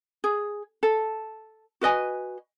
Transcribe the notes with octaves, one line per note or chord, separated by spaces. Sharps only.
G#4
A4
F#4 B4 D#5 G#5